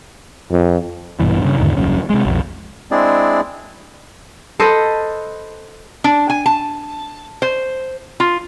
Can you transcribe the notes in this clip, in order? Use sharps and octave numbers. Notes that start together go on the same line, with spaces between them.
F2
A#1 G2 B2 E3
G2 C#3
E2 G#2 D3 D#3
D#1 C2 F#2 C#3
C3 G#3
B1 F2
G#3 C4 D4 E4 G#4 D5
A4 B4 C5 D#5
D4
G#5
A5
C5
F4